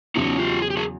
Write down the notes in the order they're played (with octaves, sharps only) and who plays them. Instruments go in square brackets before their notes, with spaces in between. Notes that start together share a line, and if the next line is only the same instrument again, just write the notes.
[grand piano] E2 C#3 F#3 [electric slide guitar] C#4 D#4
[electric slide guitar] F4 G4
G#4
G4
F#4 G#4